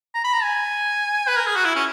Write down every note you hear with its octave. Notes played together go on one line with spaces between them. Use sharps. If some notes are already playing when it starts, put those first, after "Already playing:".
A#5
B5
A#5
G#5
B4
A#4
G#4
F#4
E4
C#4